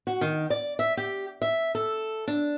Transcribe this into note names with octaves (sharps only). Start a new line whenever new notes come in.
F#4
D#3
D5
E5
G4
E5
A4
D4